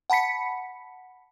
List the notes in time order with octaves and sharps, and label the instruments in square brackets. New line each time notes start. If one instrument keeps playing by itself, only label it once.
[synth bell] F#5 A5 B5 B6 C#7